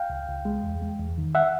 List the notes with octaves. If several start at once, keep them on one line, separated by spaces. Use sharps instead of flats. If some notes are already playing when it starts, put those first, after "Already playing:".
Already playing: F5 G5
C#2
C#2
G#3
E2
G#3
E2
D#3
E5 F#5